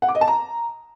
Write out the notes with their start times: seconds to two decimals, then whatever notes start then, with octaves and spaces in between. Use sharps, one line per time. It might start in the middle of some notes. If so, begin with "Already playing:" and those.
0.02 F#5
0.08 D6
0.15 D#5
0.21 A5
0.28 A#5